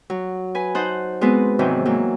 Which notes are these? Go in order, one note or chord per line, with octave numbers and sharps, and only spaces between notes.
F#3
B4 G#5
D#4 C5 F#5 A5
G#3 B3 C4 F#4 B4
G#2 C3 D#3 E3 F#3
E3 F#3 A#3